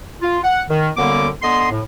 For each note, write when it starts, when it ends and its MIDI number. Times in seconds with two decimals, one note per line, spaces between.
0.22 0.39 65
0.44 0.62 78
0.69 0.90 51
0.97 1.28 42
0.97 1.28 50
0.97 1.28 55
0.97 1.28 58
0.97 1.28 59
0.97 1.28 86
1.42 1.69 50
1.42 1.69 59
1.42 1.69 75
1.42 1.69 84
1.71 1.80 45